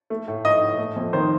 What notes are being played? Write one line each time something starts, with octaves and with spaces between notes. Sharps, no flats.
A3
A2
A2 D#5
A2
A3
F2
D#3 C5